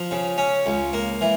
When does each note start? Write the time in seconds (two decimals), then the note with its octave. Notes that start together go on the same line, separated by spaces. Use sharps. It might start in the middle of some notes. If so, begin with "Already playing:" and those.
Already playing: F3
0.11 C#3
0.38 C#4
0.66 C#2
0.93 A#3
1.21 E3